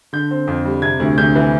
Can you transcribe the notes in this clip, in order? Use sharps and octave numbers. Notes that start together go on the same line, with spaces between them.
D3 G6
C4
F2
G3
C3 G#6
D2
D2 G6
E3